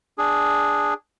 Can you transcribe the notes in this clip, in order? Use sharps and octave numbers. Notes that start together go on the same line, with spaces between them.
D4 G#4